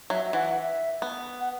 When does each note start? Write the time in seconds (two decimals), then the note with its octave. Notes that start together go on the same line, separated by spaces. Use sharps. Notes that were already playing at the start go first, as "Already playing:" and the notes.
0.10 F#3 E5
0.25 E5
0.33 E3 F#5
0.56 E5
1.02 B3
1.40 F#5